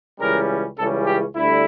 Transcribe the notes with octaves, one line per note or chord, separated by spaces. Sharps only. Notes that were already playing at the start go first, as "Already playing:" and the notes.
C#2 C#3 E3 G3 C#4 A#4
C#2 C#3 E3 G3 C#4 A4
G4
D2 D3 G3 E4